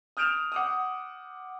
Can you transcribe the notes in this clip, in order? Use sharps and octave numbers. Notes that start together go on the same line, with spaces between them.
D#6 F6 G6 D7 E7 F7
F#5 D6 D#6